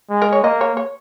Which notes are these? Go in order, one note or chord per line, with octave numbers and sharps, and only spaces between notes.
G#3
A#4
C#5
A#3 D#5
C#5
C#5